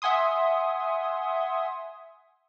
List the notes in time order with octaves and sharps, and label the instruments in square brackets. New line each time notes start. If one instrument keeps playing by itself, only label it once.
[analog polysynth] E5 F#5 G#5 C6 D#6